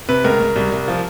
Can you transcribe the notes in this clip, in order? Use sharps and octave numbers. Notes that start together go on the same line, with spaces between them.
C3 B4
C#2 A#4
C#2
C2
C2
F3